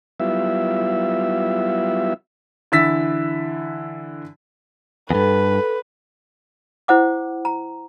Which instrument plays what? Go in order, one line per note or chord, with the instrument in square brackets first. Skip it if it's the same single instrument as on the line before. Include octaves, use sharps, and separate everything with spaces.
[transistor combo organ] F#3 G3 B3 E4 F4 E5
[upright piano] D3 E3 E4 E6 A6 B6
[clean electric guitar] E2 G2 [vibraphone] A4 [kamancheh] B4
[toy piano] E4 C5 F#5 D6
A#5